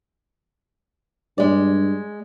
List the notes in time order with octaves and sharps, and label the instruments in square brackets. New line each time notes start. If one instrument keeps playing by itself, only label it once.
[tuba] G2 [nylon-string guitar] G#3 D5